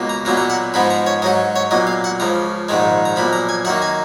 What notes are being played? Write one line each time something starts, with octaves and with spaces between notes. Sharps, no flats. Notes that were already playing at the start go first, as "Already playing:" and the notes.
Already playing: C#2 B2 A#3
A#5
B1 A#2 F#3 B3 A#5
A#5
F#5
G#2 F3 G#3 B3 B5
A#5
C#5
G#2 F#3 C#4 D#5
C#5
B1 A#2 F#3 D#5
F5
F#5
C#2 C#3 F3 A#5
A#1 G#2 D#3 G#3
A#5
B1 A#2 F3 B5
A#5
G#5
F#2 D#3 A#3 F#5
G#5